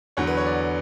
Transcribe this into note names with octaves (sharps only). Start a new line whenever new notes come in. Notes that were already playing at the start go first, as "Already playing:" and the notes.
E2 D3 F#3 C#5
B4
C#5
D5